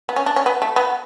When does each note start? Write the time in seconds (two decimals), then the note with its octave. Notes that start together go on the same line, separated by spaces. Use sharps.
0.09 B3
0.16 C#4
0.26 D4
0.36 C#4
0.46 B3
0.62 A3
0.76 B3